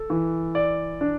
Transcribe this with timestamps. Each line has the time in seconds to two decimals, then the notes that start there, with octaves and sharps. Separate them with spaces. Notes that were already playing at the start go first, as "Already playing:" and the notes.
Already playing: A4
0.10 E3
0.55 D5
1.01 D4